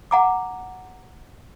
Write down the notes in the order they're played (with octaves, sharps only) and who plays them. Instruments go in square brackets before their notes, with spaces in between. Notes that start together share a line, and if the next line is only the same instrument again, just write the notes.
[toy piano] F#5 A#5 D6